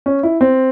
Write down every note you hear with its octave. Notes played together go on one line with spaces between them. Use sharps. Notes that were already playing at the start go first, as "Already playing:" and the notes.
C#4
E4
C4